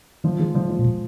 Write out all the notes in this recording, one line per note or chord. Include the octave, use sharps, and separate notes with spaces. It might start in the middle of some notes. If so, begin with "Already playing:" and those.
D#3 F3
D#3 G#3
C#3 F3
F3
A#2
B2